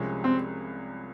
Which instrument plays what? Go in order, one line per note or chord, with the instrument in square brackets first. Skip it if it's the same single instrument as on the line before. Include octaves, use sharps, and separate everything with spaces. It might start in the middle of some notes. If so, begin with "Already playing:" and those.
Already playing: [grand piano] C2 C3 F3 G#3 C#4
[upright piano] C4